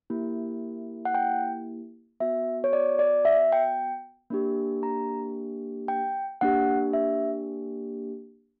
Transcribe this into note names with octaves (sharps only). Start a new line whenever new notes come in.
A#3 E4 G4
F#5
G5
B3 F#4 E5
C#5
D5
D5
E5
G5
A#3 D4 G4
A#5
G5
A#3 D4 G4 F#5
E5